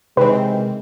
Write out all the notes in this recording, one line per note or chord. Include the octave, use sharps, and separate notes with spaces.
C3 D#3 E3 G#3 C4 B4